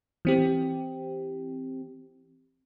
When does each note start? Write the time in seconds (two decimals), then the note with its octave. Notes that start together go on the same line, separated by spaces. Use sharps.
0.25 E3 C4 G4